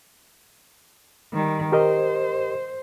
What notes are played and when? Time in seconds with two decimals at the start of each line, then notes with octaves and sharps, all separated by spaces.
1.33 D#3 G3
1.72 G4 A#4 C5 D#5